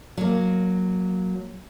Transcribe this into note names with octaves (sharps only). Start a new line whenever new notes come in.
F#3 A#3